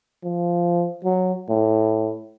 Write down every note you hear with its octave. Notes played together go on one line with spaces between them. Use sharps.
F3
F#3
A2